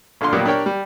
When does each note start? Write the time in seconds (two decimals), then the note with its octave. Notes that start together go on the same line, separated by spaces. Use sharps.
0.21 A#1 D3 F5 C6
0.33 A#2 D#3 F#3 G3 A#3 B3
0.46 D4 G4 A#4 C#5 G5
0.66 G3